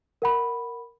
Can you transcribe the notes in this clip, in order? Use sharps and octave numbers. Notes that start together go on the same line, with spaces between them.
A#4 F#5 B5